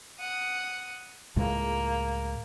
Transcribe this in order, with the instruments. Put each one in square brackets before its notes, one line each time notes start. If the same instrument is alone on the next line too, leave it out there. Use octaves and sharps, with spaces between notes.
[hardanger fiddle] F#5 D#6
[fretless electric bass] C#2 A2 G#3 [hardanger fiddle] A#3